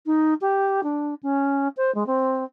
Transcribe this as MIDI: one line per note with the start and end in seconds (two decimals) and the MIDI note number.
0.06 0.34 63
0.41 0.81 67
0.83 1.14 62
1.23 1.68 61
1.77 1.93 72
1.95 2.06 56
2.06 2.44 60